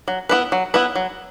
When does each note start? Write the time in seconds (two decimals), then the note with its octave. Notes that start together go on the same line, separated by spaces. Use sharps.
0.08 F#3
0.29 B3 E4 B4
0.52 F#3
0.74 B3 E4 B4
0.96 F#3